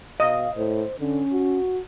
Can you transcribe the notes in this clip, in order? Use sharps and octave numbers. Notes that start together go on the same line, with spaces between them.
B2 D#5 F5
A2 C5
D3 C#4
F#4